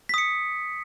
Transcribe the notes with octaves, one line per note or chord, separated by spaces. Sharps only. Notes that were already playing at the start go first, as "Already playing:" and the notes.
D#6 B6 C#7